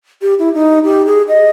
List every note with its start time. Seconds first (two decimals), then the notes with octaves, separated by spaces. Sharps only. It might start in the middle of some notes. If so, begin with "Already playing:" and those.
0.22 G4
0.39 E4
0.54 D#4
0.84 G4
1.06 G#4
1.29 D#5